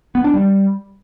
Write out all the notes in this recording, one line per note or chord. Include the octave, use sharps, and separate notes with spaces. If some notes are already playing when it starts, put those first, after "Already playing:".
B3
D4
G3